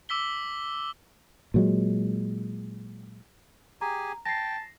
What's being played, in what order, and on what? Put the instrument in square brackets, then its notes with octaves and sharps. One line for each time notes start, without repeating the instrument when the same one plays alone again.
[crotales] D6 E6 B6 G7
[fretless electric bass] A#2 F#3 G#3
[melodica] G4 G#4 G#5 [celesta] A#5
[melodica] G5 [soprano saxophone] A5 [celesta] A#6 C7